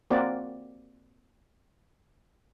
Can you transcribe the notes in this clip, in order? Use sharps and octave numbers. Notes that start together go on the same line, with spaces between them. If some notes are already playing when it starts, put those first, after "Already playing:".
A#3 C4 F#4 D5